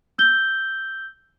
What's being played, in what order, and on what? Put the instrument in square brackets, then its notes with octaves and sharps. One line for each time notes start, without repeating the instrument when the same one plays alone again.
[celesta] E6 G6 G7